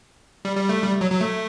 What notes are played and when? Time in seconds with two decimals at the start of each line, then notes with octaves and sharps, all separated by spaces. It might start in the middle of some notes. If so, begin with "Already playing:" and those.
0.45 G3
0.57 G3
0.69 A3
0.82 G3
1.01 F#3
1.11 F#3
1.21 A3